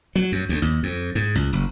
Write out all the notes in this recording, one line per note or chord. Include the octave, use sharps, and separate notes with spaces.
F#3
F#2
D2
D#2
F2
G#2
C#2
F#1